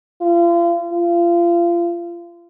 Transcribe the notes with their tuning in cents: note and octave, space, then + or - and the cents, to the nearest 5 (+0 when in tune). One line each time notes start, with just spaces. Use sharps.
F4 -35
F4 -30